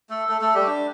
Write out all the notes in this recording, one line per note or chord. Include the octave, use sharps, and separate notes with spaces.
A3 A4
A3 A4
A3 A4
G3 G4
D4